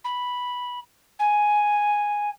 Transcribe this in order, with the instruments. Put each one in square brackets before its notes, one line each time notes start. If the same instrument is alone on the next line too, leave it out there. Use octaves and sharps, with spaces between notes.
[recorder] B5
G#5